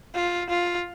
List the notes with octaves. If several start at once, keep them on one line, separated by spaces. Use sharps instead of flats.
F4
F4